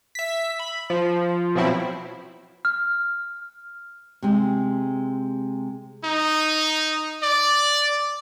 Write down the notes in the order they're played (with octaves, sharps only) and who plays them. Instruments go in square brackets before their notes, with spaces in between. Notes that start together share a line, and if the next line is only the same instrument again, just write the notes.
[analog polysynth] E5 B6
B5
F3
B2 F3 F#3 C4 E4
[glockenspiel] F6
[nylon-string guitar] C3 G#3
[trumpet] D#4
D5